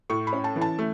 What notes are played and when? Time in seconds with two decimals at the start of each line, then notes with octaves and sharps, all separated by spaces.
0.10 A2 C#6
0.27 B5
0.33 C#4
0.44 A5
0.56 E3
0.61 A5
0.78 A3